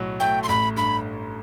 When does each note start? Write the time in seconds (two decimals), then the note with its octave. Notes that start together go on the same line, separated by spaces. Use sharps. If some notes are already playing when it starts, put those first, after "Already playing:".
Already playing: B1 A2 F#3
0.20 A3 G5
0.43 C6
0.49 A1 B5
0.76 G2 B5